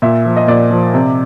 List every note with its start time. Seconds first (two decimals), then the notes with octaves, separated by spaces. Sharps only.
0.02 A#2 E5
0.25 F3
0.37 D#5
0.47 A#2 D5
0.71 F3
0.94 C3